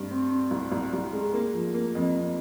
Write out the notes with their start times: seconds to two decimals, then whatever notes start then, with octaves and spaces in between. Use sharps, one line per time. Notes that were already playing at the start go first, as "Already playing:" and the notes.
Already playing: G2
0.11 C4
0.31 C4
0.51 C2
0.72 C2
0.93 C2
1.13 G#3
1.33 A#3
1.54 F3
1.74 A#3
1.95 F2
2.15 F2